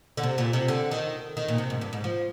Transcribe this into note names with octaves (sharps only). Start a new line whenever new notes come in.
D3
C3
A#2
C3
D3
D#3
D#3
A#2
C3
G#2
G2
G#2
F3